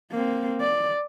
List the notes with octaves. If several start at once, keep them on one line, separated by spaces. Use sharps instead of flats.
A#3 C4
D5